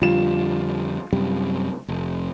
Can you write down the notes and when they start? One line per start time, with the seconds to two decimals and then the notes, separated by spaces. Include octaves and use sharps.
0.02 F2 D3 G3 F4 E7
1.13 F#2 C3 G3
1.88 F1